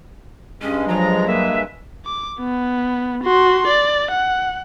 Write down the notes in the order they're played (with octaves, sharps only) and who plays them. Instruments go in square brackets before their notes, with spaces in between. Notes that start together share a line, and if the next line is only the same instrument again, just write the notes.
[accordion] G2 G#3 [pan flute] C#4
[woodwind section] F3 A#5 [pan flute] F#3
[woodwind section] A#3 B4 E5
[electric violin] D6
B3
F#4 C6
D5
F#5